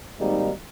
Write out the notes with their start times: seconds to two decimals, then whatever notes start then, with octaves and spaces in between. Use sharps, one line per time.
0.18 G#1 G#2 G3 A#3 D#4